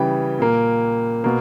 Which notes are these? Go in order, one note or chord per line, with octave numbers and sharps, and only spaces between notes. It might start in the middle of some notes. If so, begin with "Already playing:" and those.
Already playing: C#3 E3 G3 G5
A#2 A#3
B2 A#3